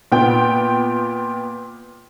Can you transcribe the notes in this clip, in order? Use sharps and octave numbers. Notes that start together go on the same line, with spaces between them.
A#2 B3 G5